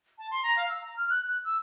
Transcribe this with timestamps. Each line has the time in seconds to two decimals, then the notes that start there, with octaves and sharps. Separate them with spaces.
0.18 A5
0.31 C6
0.43 A#5
0.57 F5
0.68 E6
0.81 A#5
0.96 F6
1.10 F#6
1.27 F#6
1.44 E6